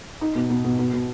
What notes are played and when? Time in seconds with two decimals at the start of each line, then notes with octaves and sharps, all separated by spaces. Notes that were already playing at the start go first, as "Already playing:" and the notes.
0.21 D#4
0.35 B2
0.50 B2
0.64 B2
0.79 B2
0.93 B2